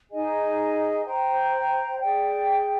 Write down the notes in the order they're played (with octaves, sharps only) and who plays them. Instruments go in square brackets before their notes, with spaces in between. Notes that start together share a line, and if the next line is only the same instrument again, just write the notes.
[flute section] D#4 G#4 D#5 G#5
C5 G5 A#5
G#4 D5 G5